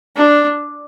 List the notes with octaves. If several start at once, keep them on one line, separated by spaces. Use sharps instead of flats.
D4